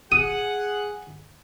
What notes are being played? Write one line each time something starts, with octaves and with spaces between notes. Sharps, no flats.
G#4 F#5 D#6